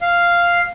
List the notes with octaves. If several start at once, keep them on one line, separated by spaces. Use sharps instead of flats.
F5